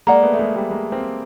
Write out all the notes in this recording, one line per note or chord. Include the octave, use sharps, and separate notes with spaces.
G#3 A#3 D5 F#5 A#5
A3 B3
A3
G#3 A#3
G3 A3
G#3 A#3
A#3 C4